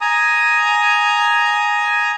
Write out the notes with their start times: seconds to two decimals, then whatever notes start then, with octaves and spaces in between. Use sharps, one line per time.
0.01 G#5 A#5 D#6